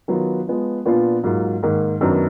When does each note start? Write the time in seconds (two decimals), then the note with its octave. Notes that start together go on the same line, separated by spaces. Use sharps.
0.08 D#3 F#3 B3 F4
0.47 F3 G#3 B3
0.86 A#2 F3 B3 D4 F4
1.24 G#2 F#3 A#3 F4
1.63 G#2 D#3 A#3
2.01 F#2 D#3 F#3 B3 D4